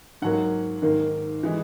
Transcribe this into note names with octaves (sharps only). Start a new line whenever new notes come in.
G#2 F#3 A#3 F#5
G#2 D#3 A#3
E3 G#3